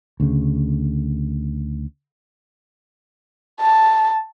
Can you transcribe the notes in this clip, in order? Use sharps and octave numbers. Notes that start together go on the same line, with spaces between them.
D2 C#3
A5